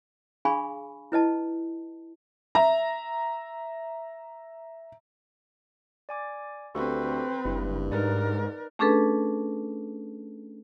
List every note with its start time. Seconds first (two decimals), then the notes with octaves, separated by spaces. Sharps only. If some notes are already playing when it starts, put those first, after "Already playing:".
0.45 D4 G#4 F5 G#5 B5 C#6
1.12 E4 B4 D#5 A5
2.55 E5 A#5
6.09 D5 G#5 D6
6.75 D2 C4 G4 A4 B4 C#6
7.45 F#1 G2 E4
7.92 G#2 D#4 A#4 B4 D5
8.79 A3 C#4 D4 G#4 A4 B4